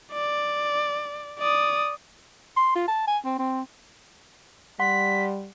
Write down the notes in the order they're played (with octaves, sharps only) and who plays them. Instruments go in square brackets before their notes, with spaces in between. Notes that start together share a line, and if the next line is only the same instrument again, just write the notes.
[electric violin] D5
D5 D#6
[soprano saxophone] C6
F4
A5
G#5
C4
C4
[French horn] G3 [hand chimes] F#5 C6 [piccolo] B6